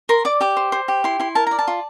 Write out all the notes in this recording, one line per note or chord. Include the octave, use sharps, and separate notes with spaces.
A#4 C6
D5 D6
G4 D6
C5
C5
G4
E4 C6
E4 C6
A#4 A5
D5 A#5
A5
F4